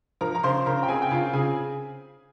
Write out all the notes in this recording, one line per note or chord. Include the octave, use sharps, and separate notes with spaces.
F3 A#4 A#5
A#5
C#3 C5 C6
C#3 A#4 A#5
G5
C4 G#4 G#5
G5
C#3 F4 F5
C#3 G#4 G#5